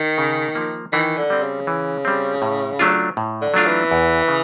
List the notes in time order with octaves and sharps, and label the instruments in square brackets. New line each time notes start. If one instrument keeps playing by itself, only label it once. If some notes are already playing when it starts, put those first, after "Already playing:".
Already playing: [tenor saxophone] D#3
[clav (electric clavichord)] C#3
F3 A#3
[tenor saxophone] D#3 [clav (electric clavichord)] E3
[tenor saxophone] D3
[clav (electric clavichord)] G3 C4
[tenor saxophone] C#3
[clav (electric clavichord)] E3
G3 C4
A2
F#3 A3 D4 F4
A2
[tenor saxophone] D3
[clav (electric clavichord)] F#3 A3 D4 F4
[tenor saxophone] E3
[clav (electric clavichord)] E2
C#3